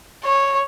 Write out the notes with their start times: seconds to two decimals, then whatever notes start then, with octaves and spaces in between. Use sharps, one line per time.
0.24 C#5